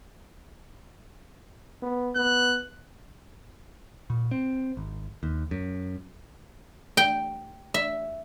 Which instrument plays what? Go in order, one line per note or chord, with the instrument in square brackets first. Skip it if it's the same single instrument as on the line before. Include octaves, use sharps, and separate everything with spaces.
[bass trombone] B3
[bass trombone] B3 [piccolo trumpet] F#6
[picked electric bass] A#2
C4
G#1
D#2
F#2
[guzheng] G5
E5